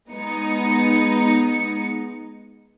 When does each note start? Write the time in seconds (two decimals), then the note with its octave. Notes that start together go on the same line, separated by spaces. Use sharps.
0.12 G#3 B3 D#4 C#7